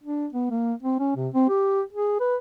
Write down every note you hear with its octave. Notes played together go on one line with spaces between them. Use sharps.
D4
B3
A#3
C4
C#4
C3
C4
G4
G#4
B4